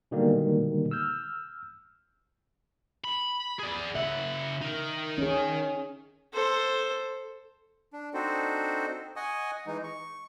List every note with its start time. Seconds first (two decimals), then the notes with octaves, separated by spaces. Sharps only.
0.11 B2 D3 D#3 G3 G#3 A#3
0.91 E6 F6 G6
3.04 B5
3.59 G#4 D5
3.95 C#3 E5 F#5
4.61 D#4 A#4
5.18 C#4 G#4
6.34 A4 C5
7.93 D4
8.14 C4 D4 D#4 F#4 A4 C5
9.16 D#5 F#5 G#5 C#6 D#6
9.67 E3 G#3 D#4
9.83 C#6